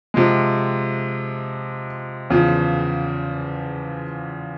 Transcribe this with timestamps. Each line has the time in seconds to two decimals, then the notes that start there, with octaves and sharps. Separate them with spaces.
0.14 C3 F3 G#3
2.30 E2 C#3 F3